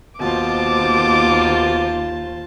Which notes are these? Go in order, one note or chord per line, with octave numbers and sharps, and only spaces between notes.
D#2 B2 F4 C5 A5 D6